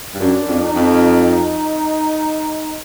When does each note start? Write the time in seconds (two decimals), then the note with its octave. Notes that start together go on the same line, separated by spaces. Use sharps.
0.14 G2
0.20 F#2 D4
0.47 F2
0.62 D#4
0.76 F2